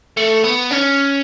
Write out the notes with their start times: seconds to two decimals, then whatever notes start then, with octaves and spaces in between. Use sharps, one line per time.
0.17 A3
0.44 B3
0.71 C#4